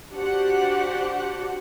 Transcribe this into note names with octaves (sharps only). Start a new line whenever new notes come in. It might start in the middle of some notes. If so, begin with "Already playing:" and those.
D4 F#4 G4 C5 F#5